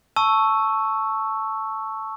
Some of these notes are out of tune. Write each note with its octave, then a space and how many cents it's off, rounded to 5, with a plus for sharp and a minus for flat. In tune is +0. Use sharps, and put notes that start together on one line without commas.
A5 +0 C#6 +0 E6 +0